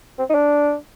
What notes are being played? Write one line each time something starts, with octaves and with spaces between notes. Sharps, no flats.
C4
D#4
D4